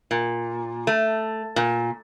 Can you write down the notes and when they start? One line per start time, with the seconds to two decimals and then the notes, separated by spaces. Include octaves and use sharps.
0.11 A#2
0.87 A3
1.56 A#2